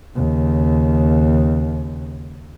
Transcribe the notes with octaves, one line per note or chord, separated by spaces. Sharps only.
D#2 C#3